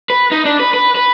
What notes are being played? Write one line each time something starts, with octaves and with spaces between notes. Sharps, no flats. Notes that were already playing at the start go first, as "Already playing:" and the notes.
B4
D#4
D4
B4
B4
B4